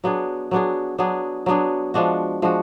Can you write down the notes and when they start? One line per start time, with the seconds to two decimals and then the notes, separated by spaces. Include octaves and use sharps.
0.04 F#3 B3 D4 G#4
0.51 F#3 B3 D4 G#4
0.98 F#3 B3 D4 G#4
1.46 F#3 B3 D4 G#4
1.94 F3 G#3 D4 F#4
2.42 F3 G#3 D4 F#4